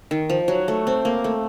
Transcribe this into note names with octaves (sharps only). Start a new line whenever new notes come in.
D#3
F3
F#3
A3
C4
A#3
A3